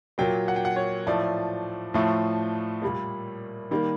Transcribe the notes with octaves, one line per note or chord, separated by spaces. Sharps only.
A#2 F#3 A#3 G5
F#5
G5
F#5
C#5
A2 F3 A3 D5
A2 F3 A3
A#2 G3 A#3
D#3 G3 A#3